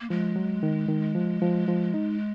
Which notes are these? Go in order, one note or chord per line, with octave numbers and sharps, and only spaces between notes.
A#3
F3 G#3
F#3
D#3
D#3
F3
F3
F3
D#4